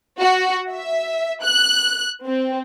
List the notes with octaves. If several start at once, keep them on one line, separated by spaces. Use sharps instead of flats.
F#4
E5
F#6
C4